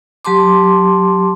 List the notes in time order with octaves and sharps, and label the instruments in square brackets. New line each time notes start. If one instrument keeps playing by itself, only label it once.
[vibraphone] F#3 G4 A5 C6 D6